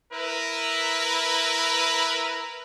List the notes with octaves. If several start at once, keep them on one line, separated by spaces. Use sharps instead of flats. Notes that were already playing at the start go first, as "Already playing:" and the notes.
E4 A#4 B4